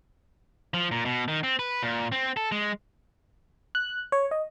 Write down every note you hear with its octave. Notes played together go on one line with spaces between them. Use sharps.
F3
A#2
B2
D#3
C4
B4
A#2
C4
A4
G#3
F#6
C#5
D#5